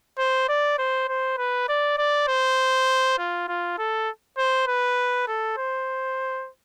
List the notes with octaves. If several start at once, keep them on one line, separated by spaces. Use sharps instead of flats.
C5
D5
C5
C5
B4
D5
D5
C5
F4
F4
A4
C5
B4
A4
C5